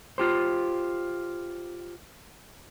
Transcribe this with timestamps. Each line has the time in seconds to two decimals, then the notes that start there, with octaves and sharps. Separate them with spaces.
0.18 F4 G4 C5